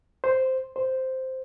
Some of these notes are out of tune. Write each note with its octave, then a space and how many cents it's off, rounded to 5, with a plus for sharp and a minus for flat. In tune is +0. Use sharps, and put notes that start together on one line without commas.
C5 -5
C5 -5